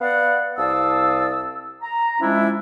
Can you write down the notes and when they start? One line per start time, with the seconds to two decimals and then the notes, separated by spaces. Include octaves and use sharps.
0.01 B3 D5 F5 F#5
0.58 C2 D5 F5 A5 D#6 E6
1.82 A#5
2.21 F3 G#3 C#4 D4 E4